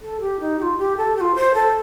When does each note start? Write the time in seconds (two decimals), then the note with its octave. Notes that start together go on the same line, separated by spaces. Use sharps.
0.02 A4
0.20 G4
0.40 D#4
0.59 G4
0.62 F4
0.78 G4
0.97 A4
1.16 G4
1.21 F4
1.35 C5
1.54 A4